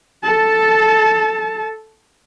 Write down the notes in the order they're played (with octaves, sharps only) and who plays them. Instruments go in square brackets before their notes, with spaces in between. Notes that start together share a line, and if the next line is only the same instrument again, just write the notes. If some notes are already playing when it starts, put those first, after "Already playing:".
[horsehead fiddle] A4 A5